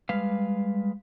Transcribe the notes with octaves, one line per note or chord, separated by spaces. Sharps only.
G3 G#3 B4 F5